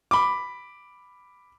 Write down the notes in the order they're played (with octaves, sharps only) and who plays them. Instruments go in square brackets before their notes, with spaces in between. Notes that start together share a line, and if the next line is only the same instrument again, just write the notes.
[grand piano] B5 D6